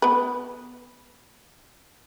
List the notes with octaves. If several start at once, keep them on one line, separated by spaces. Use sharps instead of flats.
B3 B4